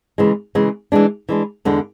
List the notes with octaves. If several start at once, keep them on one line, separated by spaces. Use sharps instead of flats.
C#3 E3 G#3
C#3 E3 G#3
E3 G#3 D4
E3 G#3 D4
E2 D3 G#3 D4